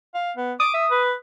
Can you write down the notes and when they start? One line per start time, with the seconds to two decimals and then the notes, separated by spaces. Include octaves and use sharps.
0.14 F5
0.37 B3
0.60 D6 D#6
0.74 E5
0.91 B4